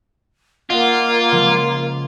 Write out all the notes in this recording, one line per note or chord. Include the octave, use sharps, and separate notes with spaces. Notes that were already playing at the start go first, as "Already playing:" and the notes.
A#3 F4 D#5 F#5
C#3 F3 G#3